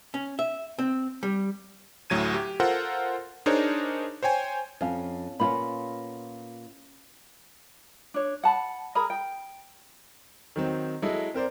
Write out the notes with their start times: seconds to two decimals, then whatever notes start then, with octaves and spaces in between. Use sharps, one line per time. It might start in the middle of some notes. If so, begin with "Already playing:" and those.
0.14 C#4
0.39 E5
0.79 C4
1.23 G3
2.10 D2 A2 F#3 G#6 D#7
2.34 G4
2.60 F4 A4 A#4 C5 F#5
3.46 D4 D#4 G#4 A#4 C5 C#5
4.23 C5 C#5 G5 G#5
4.81 F2 C#4 F5
5.40 A#2 B3 C#4 D#4 F4 B5
8.14 D4 C#5
8.43 F#5 A5 B5
8.95 G#4 A#4 A#5 B5
9.10 G5
10.56 D#3 F#3 C4
11.02 F#3 G#3 E4 A4 D#5
11.34 C4 A#4 C5 D5